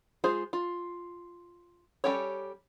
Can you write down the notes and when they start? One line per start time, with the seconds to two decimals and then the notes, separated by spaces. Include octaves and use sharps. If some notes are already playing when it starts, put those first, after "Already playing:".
0.24 G#3 F4 G#4 C5
0.53 F4
2.04 G3 C#4 G4 A4 C#5